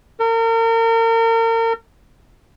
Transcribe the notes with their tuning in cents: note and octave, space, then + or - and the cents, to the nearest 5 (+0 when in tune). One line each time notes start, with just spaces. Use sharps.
A#4 -35